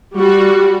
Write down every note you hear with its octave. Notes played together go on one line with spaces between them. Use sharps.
G3 F#4